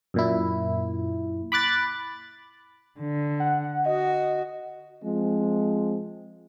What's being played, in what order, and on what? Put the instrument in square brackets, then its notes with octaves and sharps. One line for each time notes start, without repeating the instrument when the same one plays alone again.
[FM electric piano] F#2 A#2 E4
B5 D6 F#6 A6
[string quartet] D3
[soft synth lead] F#5
[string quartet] F#4 [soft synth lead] D#5
[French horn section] F3 G#3 C4